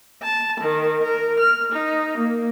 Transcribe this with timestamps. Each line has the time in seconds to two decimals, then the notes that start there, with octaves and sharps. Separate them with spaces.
0.22 A5
0.60 D#3
1.03 A#4
1.38 F6
1.72 D#4
2.18 A#3